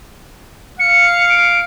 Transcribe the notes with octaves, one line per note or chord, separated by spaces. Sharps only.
F5 C#7
D7